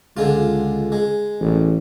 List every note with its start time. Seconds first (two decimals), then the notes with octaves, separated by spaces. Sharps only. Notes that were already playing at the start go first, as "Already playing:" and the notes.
0.17 C#2 D3 G#3 F4
0.92 G#3
1.40 A1